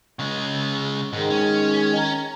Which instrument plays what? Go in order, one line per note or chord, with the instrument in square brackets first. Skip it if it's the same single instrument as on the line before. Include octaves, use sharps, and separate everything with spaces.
[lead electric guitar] C#3 G#3
[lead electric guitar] G#2 [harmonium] D#3 G#3
[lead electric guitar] C#4
[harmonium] A#5